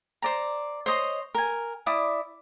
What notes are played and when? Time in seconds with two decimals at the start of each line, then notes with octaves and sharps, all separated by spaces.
0.22 C5 D5 A#5
0.86 C5 C#5 D#5 C6
1.35 A#4 G#5
1.86 E4 D5 D6 D#6